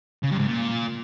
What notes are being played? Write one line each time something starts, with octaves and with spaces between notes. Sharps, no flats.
C#3
G2
G#2
A#2